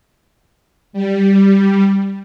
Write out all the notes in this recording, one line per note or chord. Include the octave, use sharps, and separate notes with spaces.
G3